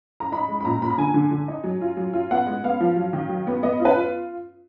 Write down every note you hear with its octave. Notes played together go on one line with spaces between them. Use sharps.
A#5
D#4 B5
G#3
B5
A#2 A#5
A#2 B5
A#5
D3 G#5
D3
D3
D#4
F#3
F4
F#3
F4
B3 F#5
G#3
B3 F5
F3
F#3
D#3
F#3
B3
B3 D#5
F4
B4
F4